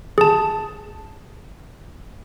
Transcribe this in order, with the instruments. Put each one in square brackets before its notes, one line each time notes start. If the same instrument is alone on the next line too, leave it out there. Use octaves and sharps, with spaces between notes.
[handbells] G#4 A5